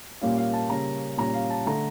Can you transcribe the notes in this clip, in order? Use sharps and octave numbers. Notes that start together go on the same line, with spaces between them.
A#2 G3 A#3 C#4 F5
F5
A5
C#3 G3 A#3 C#4 A#5
A#2 G3 C#4 A#5
F5
A5
D3 A3 A#5